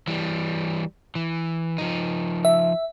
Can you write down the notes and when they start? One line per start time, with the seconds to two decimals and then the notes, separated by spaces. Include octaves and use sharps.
0.07 E3 G3
1.15 E3
1.78 F3 D#4
2.45 E5